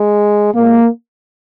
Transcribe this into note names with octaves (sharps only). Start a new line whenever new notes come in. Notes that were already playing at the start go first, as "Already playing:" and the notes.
Already playing: G#3
A#2 G#3 A#3